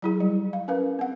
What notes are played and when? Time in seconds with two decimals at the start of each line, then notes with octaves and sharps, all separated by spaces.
0.02 F#3 E4 G#4
0.20 G3
0.53 F5
0.68 C#4 A#4 B4 F5
0.99 C4 F#5